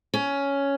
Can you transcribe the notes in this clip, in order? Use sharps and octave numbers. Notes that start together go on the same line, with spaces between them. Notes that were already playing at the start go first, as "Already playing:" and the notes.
C#4